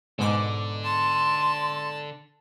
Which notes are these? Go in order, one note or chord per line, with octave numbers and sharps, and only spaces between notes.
G#2 B2 D3 D6
A5 C6